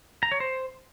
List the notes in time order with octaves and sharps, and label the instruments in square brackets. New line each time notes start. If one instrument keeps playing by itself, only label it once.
[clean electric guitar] A#5
C#5
C5